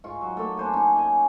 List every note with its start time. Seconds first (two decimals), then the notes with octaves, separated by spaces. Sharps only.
0.04 G#2 F4 C#6
0.21 F#3
0.37 A3 A#3 A4 B5
0.57 D4 C5 G#5
0.73 C#4 D#4
0.96 D#5 G#5